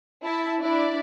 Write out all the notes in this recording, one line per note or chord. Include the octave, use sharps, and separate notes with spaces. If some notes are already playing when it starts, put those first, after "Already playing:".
E4 A5
D4 E4 D5